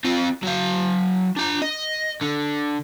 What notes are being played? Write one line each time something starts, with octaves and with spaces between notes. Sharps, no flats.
C4 F4
F#3 F5
D4 A#5
D#5
D3